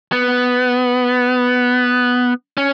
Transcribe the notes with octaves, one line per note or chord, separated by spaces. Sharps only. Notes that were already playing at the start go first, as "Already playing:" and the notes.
B3
C#4